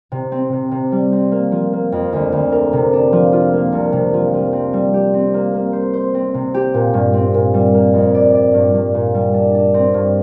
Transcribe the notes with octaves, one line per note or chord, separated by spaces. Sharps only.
C3
C4
C3
C3
G3
C4
A#3
F3
A#3
F2
D2
D2
A#4
C3
D4
F3
F4
A#3
C2
C3
F3
F3
C4
G3
G4
C4
A#3
A#3
C5
C5
C4
C3
G4
A#2
G2
C4
A#2
G3
A#3
F2
D5
D5
G2
G2
A#2
G3
D4
D4
C4
G2